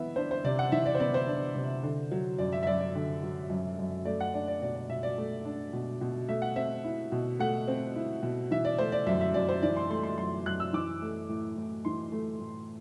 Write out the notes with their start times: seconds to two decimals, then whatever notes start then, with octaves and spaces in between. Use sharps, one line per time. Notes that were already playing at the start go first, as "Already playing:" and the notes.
Already playing: E3 B3 E5
0.16 D4 C5
0.31 C5
0.44 C3 D5
0.59 F#5
0.72 E3 E5
0.86 D5
0.95 C5
1.00 B3 D5
1.14 C5
1.27 D4
1.55 C3
1.83 D3
2.11 F#3
2.38 F#2 D5
2.52 E5
2.63 E5
2.67 F#2 D5
2.80 D5
2.95 D3
3.23 F#3
3.50 F#2
3.79 F#2
4.05 A3 D5
4.20 F#5
4.34 D4 D5
4.48 D5
4.62 B2 D5
4.75 D5
4.89 B2 E5
5.03 D5
5.18 A3
5.45 D4
5.73 B2
6.01 B2
6.28 A3 E5
6.42 F#5
6.56 C4 E5
6.84 E4
7.12 B2
7.39 A3 F#5
7.68 C4
7.96 E4
8.23 B2
8.51 E3 E5
8.65 D5
8.78 A3 C5
8.92 D5
9.06 F#2 E5
9.21 E5
9.34 F#2 D5
9.49 C5
9.63 E3 D5
9.77 C6
9.90 A3 C6
10.03 C6
10.18 F#2 C6
10.46 F#2 F#6
10.60 E6
10.73 E3 D6
11.02 A3
11.29 A2
11.57 A2
11.85 E3 C6
12.12 A3
12.40 A2